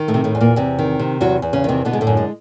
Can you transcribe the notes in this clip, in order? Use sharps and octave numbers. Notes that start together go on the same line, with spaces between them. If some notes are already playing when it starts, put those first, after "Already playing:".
Already playing: D#3
A2 A3
C3
A2 A3
E2
A#2 A#3
E2 C3 C4
D#3
C3
E2 F#3 F#4
E2
C#3 C#4
C3 D#3 C4
B2 D3 B3
G#3
A2 A3
F#2
G#3